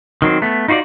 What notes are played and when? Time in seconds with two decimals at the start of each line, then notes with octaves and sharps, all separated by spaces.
0.22 D#3 F#3 C4
0.42 A3 B3
0.68 D#4 F4 F#4 B4 D5